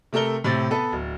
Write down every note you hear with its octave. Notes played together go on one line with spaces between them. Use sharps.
C3 A3 A4 A#4 G7
A2 C3 C4 A6
B3 A4 B4
D1